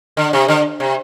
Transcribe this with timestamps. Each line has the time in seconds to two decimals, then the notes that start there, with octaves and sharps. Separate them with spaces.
0.17 D3
0.33 C3
0.48 D3
0.80 C3